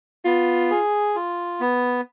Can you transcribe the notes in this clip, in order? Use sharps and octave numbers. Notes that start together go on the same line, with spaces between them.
B3 F4
G#4
F4
B3